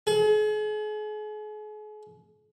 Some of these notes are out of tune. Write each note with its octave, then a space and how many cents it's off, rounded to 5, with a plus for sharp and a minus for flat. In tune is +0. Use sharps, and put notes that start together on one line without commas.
G#4 +40